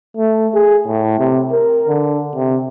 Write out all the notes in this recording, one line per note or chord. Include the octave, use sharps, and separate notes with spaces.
A3
G#4
A2
C3
A#4
D3
C3